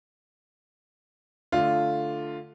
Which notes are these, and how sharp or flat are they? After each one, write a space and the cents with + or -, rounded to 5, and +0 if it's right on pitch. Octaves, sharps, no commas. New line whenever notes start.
D3 +0 A3 +0 F4 +0